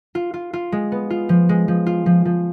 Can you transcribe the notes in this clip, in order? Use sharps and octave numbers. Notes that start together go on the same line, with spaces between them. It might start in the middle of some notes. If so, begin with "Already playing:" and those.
F4
F4
F4
G#3
B3
F4
F3
G#3
F3
F4
F3
F3